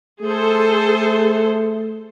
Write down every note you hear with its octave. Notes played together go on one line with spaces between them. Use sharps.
A3 G#4 A4 C5